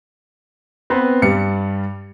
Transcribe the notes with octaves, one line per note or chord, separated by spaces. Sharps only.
B3 C4 B4
G2 G3 C#7